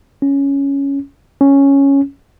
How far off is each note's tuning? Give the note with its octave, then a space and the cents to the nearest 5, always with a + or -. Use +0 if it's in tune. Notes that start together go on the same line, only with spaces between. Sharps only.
C#4 +5
C#4 +0